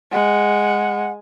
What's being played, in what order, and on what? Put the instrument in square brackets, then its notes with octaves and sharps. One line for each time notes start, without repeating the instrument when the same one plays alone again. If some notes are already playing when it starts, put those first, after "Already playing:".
[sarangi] G#3 [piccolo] F#5